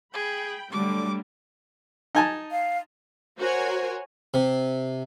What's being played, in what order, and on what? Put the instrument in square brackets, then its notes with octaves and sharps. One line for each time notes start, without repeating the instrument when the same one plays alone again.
[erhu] G#4 [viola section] G5 B5
[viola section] D3 F#3 A3 [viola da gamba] G3 [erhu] D6
[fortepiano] D#4 G#5 A5
[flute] F5
[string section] F#4 A#4 C5 C#5 G#5
[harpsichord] C3